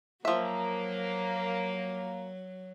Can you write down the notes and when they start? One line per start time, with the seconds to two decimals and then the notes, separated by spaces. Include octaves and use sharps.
0.25 F3 F#3 A#3 E5